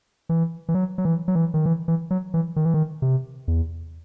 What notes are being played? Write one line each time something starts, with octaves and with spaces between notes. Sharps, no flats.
E3
E3
F#3
F#3
E3
F#3
E3
D#3
E3
E3
F#3
E3
D#3
E3
D#3
C3
E2